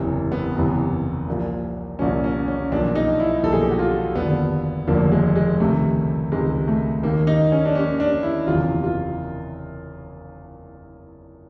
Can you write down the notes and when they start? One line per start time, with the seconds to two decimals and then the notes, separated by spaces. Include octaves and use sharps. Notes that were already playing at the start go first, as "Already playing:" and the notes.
Already playing: F#1 E2 C3 E3
0.32 B3
0.55 F#1 E2 C3 E3
1.28 C2 A#2 F3
1.99 C2 A#2 F3 C#4
2.24 C#4
2.48 C#4
2.72 B1 A#2 F3 D4
2.95 D#4
3.20 E4
3.43 B1 A#2 F3 A4
3.53 G#4
3.62 G4
3.71 F#4
3.79 F4
4.15 F1 D#2 D3 F3 B3
4.87 F1 D#2 D3 F3 A#3
5.12 G#3
5.36 G#3
5.59 C#2 C3 D#3 A3
6.32 C#2 C3 D#3 G#3
6.68 A3
7.03 D#2 D#3 A#3
7.27 D#4
7.52 C#4
7.65 D4
7.75 D#2 D#3 C#4
8.00 D4
8.23 E4
8.47 F#1 E2 C3 F4
8.84 F4